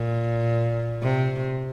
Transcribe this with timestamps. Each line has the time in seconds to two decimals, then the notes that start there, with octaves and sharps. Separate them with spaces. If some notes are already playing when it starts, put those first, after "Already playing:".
Already playing: A#2
1.03 C3